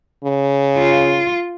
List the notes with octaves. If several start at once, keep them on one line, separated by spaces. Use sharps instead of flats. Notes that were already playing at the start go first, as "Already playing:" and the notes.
C#3
F4